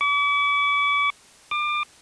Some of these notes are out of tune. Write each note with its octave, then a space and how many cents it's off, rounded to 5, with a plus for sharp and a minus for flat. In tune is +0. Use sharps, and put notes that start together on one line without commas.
D6 -45
D6 +30